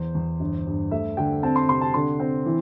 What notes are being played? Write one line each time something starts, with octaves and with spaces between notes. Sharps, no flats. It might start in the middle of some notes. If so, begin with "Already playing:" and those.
Already playing: E2 C5
E2
G1
G2
A3 E5
D3 G5
C4 A5
C6
C3 C6
A5
D3 C6
C4
E3